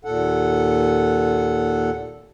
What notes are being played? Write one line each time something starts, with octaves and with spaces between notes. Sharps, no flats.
D#2 A#2 A4 F#5